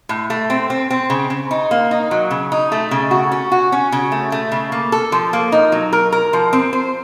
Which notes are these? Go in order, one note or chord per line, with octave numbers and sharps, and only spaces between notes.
A2
A3
C4
C4
C4
C#3
C#3
D#4
A#3
D#4
F#3
C#3
D#4
A3
C#3
F#4
C#4
F#4
C#4
C#3
A3
A3
C#3
A#3
A4
F3
A#3
D#4
F#3
A#4
A#4
F3
C4
C5